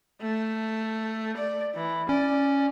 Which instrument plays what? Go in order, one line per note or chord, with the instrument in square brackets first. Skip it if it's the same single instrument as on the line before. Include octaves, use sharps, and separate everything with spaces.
[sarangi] A3
D5
E3
[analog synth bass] C#4 [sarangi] D5